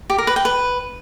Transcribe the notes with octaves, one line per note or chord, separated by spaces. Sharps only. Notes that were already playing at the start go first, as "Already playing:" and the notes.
G4
A#4
B4
G5
B4